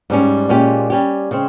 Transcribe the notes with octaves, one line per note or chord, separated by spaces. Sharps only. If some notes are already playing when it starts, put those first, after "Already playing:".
G#2 G3 C#4
A#2 G#3 C#4 G4
G3 C#4 G4
C#3 G#3 C4